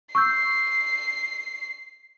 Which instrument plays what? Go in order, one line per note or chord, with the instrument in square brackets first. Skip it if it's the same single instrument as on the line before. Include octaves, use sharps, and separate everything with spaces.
[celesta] C#6 E6 G6 [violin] C7